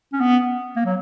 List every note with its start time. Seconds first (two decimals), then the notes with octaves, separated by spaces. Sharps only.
0.13 C#4
0.21 B3
0.76 A#3
0.85 F#3